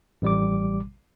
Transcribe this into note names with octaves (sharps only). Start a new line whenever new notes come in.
A1 G3 D6